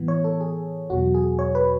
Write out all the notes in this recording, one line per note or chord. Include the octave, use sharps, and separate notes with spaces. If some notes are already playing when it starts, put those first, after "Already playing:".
Already playing: A2 E3 B3
C#5
A4
G#4
E2 B2 F#3 F#4
G#4
C#5
B4